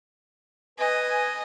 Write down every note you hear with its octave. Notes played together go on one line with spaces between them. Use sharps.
B4 D#5 G#5